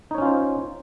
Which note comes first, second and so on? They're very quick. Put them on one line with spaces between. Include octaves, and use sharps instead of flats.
D#4 C#5 C#4 F4 C5